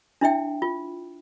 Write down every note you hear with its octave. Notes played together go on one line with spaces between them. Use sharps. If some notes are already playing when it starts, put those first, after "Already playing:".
D4 E4 E5 G5
F4